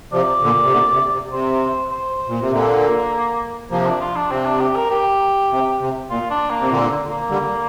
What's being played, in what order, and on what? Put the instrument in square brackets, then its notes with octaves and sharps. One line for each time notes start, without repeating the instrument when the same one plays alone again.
[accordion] C3 F3 [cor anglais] D5
[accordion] A#2 D3
C3
A#2 D3
C3
C3
[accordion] C3 [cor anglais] C5
[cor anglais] C5
[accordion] A#2
C3
[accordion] A#2 D3 [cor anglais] A#3
[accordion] C3 F3 [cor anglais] A#3
[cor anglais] D4
F4
D4
[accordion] C3 [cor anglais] C4
[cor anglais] D4
G4
A#4
G4
[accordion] C3
C3
[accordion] A#2 [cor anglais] F4
[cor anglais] D4
A#3
[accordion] C3
[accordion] A#2 D3 [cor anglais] A#3
[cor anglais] A#3
[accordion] D3 G3